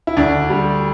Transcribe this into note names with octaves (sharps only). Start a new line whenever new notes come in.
E4
D2 D4
G3